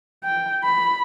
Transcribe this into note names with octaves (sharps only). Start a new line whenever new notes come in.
G5
B5